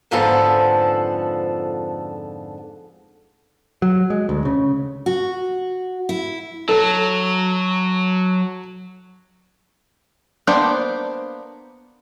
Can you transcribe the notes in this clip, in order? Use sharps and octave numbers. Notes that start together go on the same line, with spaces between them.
F2 G#2 D3 F3 B3 A4
F#3
G#3
D2
C#3
F#4
E4
F#3 A4
A#3 B3 D4 C5 G5